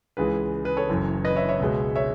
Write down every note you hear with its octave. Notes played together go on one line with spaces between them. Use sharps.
C#2 C#3 E3 G#3 G#4 B4
G#4 B4
A4 C#5
F#1 F#2 E3
B4 D#5
C#5 E5
C#5 E5
C#2 B2 G#3
C#5 E5